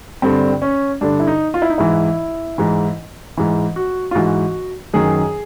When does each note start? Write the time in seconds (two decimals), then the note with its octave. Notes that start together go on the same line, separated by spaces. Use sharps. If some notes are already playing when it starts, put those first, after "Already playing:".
0.22 G2 D3 C4
0.62 C#4
1.01 G2 D3 D4
1.20 E4
1.27 D#4
1.54 F4
1.62 E4
1.70 D#4
1.78 G#2 E3 E4
2.58 G#2 E3
3.37 G#2 E3
3.76 F#4
4.11 F4
4.15 G#2 E3 F#4
4.94 F#2 D#3 G#4